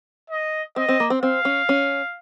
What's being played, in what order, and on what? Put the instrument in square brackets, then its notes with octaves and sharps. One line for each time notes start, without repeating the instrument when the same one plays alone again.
[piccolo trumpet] D#5
[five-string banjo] C4 [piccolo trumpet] D#5
[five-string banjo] C4
A#3
C4
[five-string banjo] C4 [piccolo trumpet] F5
[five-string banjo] C#4
C#4